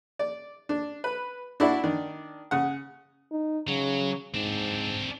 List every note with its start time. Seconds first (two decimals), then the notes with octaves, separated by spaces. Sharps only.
0.19 D5
0.69 D4
1.04 B4
1.60 D4 E4 F#4 D5
1.83 D#3 D4
2.51 C#3 F#5
3.32 D#4
3.68 C#3 F#3
4.34 G#2 C4 D4